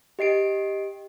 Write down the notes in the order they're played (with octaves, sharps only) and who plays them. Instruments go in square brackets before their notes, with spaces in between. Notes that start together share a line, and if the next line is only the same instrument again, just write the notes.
[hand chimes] G4 D#5 C7 D7